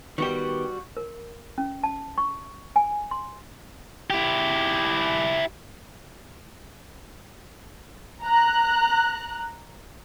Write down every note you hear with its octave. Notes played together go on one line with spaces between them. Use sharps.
D#3 G3 B3 F#4 G4
A#4
C#4
A5
C#6
G#5
C6
E4 G4
A#5 F#6